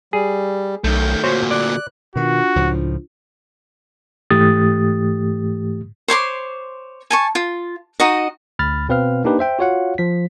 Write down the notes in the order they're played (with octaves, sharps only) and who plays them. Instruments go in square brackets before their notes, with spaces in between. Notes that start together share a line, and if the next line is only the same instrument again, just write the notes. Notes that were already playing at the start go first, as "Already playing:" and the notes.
[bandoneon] G3 [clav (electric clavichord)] G#4
[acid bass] B1 [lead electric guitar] D#3 A3 [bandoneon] G6
[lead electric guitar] D2 A#2 [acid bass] F#4 [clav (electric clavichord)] C5 C#5
[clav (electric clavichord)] D5 [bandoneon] F#6
[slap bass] B2 D#3 [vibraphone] D4 F4 [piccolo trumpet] F#4
[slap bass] C#2 A2 F3
[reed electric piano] G#2 E3 A3 G4 D#6 A6
[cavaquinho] C5 C#5 C6 D6
G#5 A5 C#6
F4
D#4 F#4 D#5
[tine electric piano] D2 B5 F6 A6
B2 C4 B4 F5 F6
A#3 D4 D#4 G4 B4
C5 E5 G5
F4 F#4 C#5 F5 F#5
F3 B6